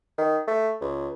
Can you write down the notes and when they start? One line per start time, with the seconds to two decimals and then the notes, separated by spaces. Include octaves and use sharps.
0.18 D#3
0.48 A3
0.81 C#2